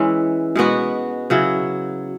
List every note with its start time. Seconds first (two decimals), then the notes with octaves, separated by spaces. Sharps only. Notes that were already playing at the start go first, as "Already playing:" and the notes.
Already playing: E3 G#3 C#4 E4
0.55 B2 G#3 B3 F#4
1.30 C#3 F#3 E4